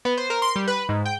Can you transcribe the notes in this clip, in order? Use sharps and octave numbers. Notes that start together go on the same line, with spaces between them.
B3
C5
A#4
C6
G3
B4
G#2
G5